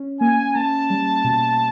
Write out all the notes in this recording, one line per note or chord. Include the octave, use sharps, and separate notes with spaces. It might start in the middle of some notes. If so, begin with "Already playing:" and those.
Already playing: C#4
A#3 G#5
A#3 A5
G3
B2